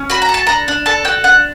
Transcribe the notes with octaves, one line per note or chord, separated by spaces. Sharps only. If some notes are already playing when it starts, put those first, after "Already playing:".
Already playing: C#4
F#4 B5
A#5
A4
A5
D4 A#5
D4
A4 A5
F#4 G5
D4 F#5